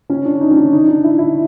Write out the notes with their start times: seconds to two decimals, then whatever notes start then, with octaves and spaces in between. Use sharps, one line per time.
0.10 C#4
0.25 D4
0.41 D#4
0.51 C#4
0.56 D4
0.73 D#4
0.87 D4
1.04 E4
1.18 E4